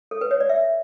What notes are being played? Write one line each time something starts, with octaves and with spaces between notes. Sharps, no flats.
A4
B4
C#5
D5
E5